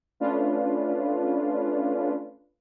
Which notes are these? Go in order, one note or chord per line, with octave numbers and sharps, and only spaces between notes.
A3 C#4 D4 F4 B4